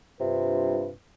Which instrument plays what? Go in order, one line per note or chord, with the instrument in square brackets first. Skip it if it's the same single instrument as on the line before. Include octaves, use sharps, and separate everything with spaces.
[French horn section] G2 F4 B4 [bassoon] C3